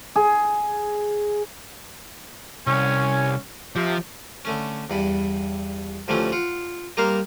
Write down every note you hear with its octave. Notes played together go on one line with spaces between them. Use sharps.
G#4
C2 C#4
C3 F3
D3 A3 C#4
E2 G2 B5
D2 C3 E3 F3 A3 C#4
F4 F#5
G3 A#3 D#4 A#4 C5 F5